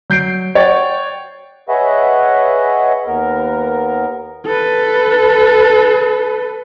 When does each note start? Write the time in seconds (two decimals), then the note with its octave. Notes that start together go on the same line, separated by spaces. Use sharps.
0.10 F#3 G6 C7 D7
0.55 C#5 D5 F#5 G5 A6
1.69 G#4 B4 C#5 D#5 E5 F#5
3.06 D#2 B3 A#4
4.46 A4 B4